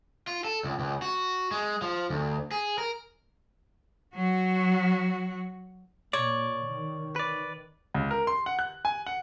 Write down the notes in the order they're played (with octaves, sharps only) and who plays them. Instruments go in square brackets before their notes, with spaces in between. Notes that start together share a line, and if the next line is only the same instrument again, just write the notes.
[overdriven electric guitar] F4
A4
C#2
C#2
F#4
G#3
F3
D2
G#4
A#4
[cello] F#3 F#4
[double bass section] A#2 [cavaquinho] C#5 [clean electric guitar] D5
[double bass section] D#3
[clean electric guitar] B4 D5
[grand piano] C#2
A#4
C6
F#5
F#6
G#5
F#5